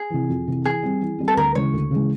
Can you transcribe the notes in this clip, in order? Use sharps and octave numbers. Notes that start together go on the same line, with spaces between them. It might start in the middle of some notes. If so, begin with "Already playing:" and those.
Already playing: G#4
C3 E3
F2
C3 E3
E3 G#4
G3 C4
E3
G3 C4
A4
D2 A#4
C#3 E3 G#3 C#5
D2
C#3 E3 G#3